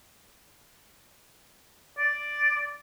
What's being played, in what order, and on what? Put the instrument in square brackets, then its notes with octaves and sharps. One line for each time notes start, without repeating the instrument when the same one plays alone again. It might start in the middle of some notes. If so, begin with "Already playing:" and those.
[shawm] D5